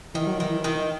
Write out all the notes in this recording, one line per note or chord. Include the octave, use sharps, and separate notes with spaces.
D#3 E3
F#3
D#3 E3
D#3